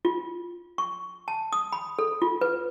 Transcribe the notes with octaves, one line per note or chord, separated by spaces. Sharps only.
F4
C#6
A5
D#6
B5
A4
F4
B4